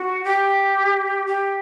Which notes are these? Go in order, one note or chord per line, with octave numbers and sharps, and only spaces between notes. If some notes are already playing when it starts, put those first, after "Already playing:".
Already playing: F#4
G4
G4